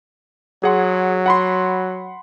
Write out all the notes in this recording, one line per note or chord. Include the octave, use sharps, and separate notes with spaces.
F#3 G#4 F#5 C6
F#5 B5 C6